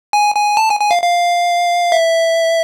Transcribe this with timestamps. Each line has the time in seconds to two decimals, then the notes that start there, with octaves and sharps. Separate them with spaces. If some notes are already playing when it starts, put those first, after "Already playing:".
0.13 G#5
0.35 G#5
0.57 A5
0.69 G#5
0.80 G#5
0.91 F5
1.02 F5
1.92 E5